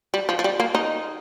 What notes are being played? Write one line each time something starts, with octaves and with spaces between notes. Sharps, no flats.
G3
F3
F3
G3
A#3
D#4